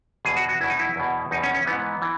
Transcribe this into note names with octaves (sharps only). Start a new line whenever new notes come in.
E2 B2 G#4
F#4
F#4
E2 B2 E4
D#4
E4
E2 B2
E2 B2 D#4
C#4
C#4
G#2 E3 B3
E3